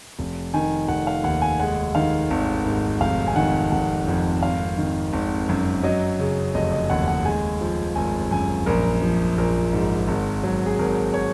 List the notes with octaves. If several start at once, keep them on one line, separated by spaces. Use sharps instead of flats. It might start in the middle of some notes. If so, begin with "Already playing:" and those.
F1
D#3 G#5
F1 F#5
F5
D#2 F#5
G#5
G#3 F#5
D#3 F5
G#1
G#2
F1 F5
G#5
D#3 F#5
F1 F#5
F2
G#1 F5
D#3
G#1
F#2
F#3 D#5
C#3
F1 D#5
D#5
D#2 F#5
F#5
G#3 G#5
F3
G#1 G#5
F#2 G#5
A#1 A#4
F3
A#1 A#4
G#2
G#1
F#3
G#4
G#1 A#4
C#5